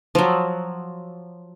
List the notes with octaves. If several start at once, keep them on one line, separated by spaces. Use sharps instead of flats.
F3 F#3